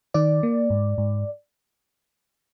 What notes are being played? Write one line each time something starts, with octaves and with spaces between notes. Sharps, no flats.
D#3 D5
A#3
G#2
G#2